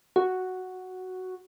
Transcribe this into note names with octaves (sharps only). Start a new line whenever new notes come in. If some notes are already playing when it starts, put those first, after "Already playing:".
F#4